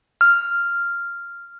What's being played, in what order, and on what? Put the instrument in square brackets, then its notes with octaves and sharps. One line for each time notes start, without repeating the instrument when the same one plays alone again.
[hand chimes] F6